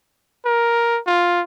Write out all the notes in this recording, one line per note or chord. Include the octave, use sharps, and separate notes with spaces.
A#4
F4